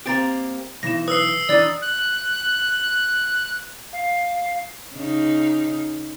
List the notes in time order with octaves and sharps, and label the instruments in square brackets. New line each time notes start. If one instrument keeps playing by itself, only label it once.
[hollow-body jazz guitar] A#3 C4 G4 [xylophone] A#5 A6 D7
[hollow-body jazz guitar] B1 E3 [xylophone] A#6 E7
[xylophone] B4 [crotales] D#6 E6 C7
[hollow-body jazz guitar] E3 D4 D#4 [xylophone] D5 A6
[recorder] F#6
F5
[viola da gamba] C#3 D#4